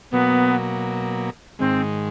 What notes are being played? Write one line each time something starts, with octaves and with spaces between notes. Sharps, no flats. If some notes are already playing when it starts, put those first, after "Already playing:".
B2 F#3 A#3 B3
G#2 D#3 G#3 C4